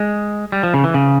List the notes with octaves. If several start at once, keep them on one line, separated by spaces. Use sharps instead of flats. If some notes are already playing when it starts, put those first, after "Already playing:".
Already playing: G#3
G3
F3
C#3
E3
C#3